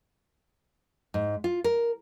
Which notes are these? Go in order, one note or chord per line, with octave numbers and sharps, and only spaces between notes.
G#2
F4
A#4